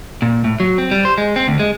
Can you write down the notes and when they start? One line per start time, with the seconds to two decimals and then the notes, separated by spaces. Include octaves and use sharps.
0.22 A#2
0.44 A2
0.60 F#3
0.78 C4
0.91 G3
1.05 C5
1.18 G#3
1.36 C4
1.48 D2
1.60 G#3